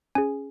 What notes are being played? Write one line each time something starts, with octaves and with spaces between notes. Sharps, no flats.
C#4 G#4 G#5